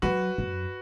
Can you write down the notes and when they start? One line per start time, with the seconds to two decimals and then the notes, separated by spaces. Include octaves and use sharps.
0.02 F#3 F#4 B4
0.38 F#2